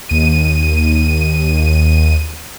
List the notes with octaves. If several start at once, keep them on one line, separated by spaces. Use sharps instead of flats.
D#2 D#7